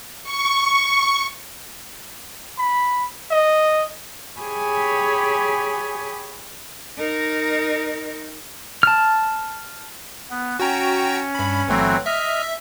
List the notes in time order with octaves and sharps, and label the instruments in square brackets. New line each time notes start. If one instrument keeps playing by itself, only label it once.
[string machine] C#6
[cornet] B5
D#5
[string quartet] G4 G#4 C#5 G#5 B5
[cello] D#4 A#4
[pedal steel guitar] A5 F6
[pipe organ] B3
[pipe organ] C#4 [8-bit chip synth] F#4 G5 A#5
[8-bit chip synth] G2 B5
[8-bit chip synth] G1 A3 [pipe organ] E3 F#3 C4
[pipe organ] D#5 F6 [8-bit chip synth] E5